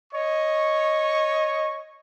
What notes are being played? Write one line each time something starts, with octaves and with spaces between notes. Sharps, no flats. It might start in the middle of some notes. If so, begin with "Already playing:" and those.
C#5 D#5 C#6